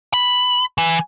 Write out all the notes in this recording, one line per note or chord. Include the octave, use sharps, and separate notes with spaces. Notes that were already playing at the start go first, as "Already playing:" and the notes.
B5
E3